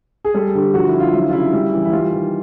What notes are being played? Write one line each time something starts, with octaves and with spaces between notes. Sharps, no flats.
G#4
G3 A4
D3 G4
F3 F#4
E4
D3
F4
F#3 E4
F4
C#3 E4
G3
E3
E4
G3 F4
D#3